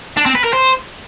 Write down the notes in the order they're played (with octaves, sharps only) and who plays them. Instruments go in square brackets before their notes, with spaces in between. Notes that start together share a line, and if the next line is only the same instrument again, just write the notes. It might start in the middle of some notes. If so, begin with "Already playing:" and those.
[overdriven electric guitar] D4
C4
B4
A#4
C5